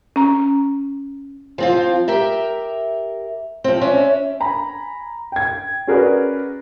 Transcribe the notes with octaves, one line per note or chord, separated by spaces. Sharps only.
C#4 A#5
F3 C4 F4
G4 A#4 E5
F3 C4
C#4 D4 E5
G#5 A#5 B5
G5 G#6
C#4 F#4 G#4 A#4 B4 D5